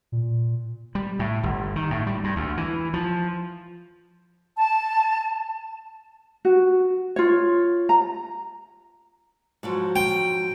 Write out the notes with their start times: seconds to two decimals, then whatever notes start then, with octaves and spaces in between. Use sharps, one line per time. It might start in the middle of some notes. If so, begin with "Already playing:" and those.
0.12 A#2
0.95 G3
1.19 A2
1.43 G1
1.76 D#3
1.91 A2
2.07 G3
2.24 G2
2.36 D2
2.57 E3
2.94 F3
4.57 A5
6.45 F#4
7.16 F4 C#5
7.89 A#5
9.63 G#2 F3 F#3
9.96 G5